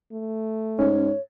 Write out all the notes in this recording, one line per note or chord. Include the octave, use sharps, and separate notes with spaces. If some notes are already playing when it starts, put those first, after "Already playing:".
A3
G#2 C#4 C#5